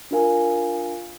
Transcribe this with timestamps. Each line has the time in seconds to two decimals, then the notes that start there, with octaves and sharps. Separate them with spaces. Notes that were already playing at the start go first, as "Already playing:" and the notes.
0.11 D4 F4 A#4 F5 G#5